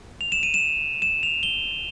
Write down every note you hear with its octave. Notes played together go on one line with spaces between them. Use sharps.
F7
E7
D#7
E7
E7
F7
G7